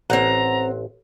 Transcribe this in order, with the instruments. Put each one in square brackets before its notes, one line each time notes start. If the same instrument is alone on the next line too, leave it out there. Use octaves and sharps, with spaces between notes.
[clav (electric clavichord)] A1 [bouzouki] C4 F#5 [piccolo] A#5